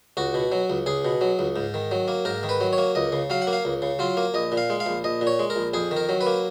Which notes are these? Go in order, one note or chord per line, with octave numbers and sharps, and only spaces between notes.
C#2 F#4
B2
F#3
C#2
C#2 G#4
B2
F#3
C#2
G#2
D#3
F#3
A#3
G#2 A#4
D#3
B4
F#3
C#5
A#3
C#2 D#5
C#3
F#3 F5
F#5
A#3
F5
C#2
C#3
F#3 F4
A#3
A#1 D#5
A#2
F5
G#3
F5
A#1
A#1 D#5
A#2
C#5
G#3
A#4
A#1
F2 G#4
D#3
A#4
F#3
B4
A#3